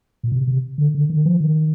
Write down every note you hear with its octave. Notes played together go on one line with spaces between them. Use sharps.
A#2
C3
C3
D3
D3
D#3
F3
D#3